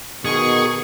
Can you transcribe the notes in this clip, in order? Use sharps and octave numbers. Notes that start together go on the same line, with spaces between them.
B2 D#3 G#4 C#6